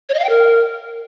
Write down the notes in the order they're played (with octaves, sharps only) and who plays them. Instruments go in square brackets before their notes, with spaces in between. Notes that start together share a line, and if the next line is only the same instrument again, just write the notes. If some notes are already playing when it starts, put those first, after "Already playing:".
[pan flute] C#5
D#5
F5
G5
A#4